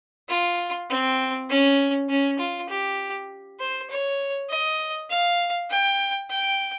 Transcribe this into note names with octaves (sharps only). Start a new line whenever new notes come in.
F4
C4
C#4
C#4
F4
G4
C5
C#5
D#5
F5
G5
G5